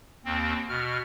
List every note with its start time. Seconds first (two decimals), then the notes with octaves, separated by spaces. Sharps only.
0.25 D#2 C4
0.69 B2 F6